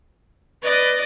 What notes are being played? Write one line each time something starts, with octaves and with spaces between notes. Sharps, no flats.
B4 D5 D#5